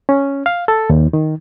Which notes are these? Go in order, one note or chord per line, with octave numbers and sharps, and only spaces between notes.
C#4
F5
A4
D#2
D#3